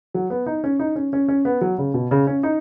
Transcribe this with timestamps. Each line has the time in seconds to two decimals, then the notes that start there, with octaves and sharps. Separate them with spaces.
0.14 F#3
0.30 B3
0.46 D#4
0.64 C#4
0.79 D#4
0.96 C#4
1.13 C#4
1.28 C#4
1.45 B3
1.61 F#3
1.78 C#3
1.94 B2
2.11 C#3
2.27 C#4
2.43 D#4